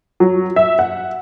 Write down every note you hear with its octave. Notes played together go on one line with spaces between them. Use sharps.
F#3
E5
F#5